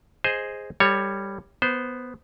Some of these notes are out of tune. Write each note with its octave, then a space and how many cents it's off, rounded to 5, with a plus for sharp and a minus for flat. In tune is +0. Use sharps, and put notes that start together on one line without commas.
G#4 +0 C5 +0 D#5 +0
G3 +10 A4 +35 C#5 +0
B3 +0 C5 -15